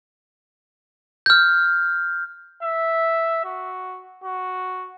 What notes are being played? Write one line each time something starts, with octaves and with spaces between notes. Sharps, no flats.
F6 G6
E5
F#4
F#4